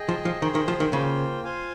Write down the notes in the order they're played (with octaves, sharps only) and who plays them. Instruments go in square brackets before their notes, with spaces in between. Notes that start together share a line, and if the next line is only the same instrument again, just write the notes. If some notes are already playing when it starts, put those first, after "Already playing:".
Already playing: [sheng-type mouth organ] G#4 D#5 G5
[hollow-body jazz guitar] F3
F3
[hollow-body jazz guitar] D#3 [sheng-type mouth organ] G#4 C5 G5
[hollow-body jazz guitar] D#3
F3
D#3
[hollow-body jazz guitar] C#3 [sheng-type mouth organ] A#3 F4 C5 G5
[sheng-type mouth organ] F4 C5 F5 G#5